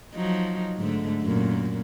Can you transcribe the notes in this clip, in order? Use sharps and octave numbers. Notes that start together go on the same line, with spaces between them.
F3 F#3 D#4
G#2 D3 A3
F#2 A#2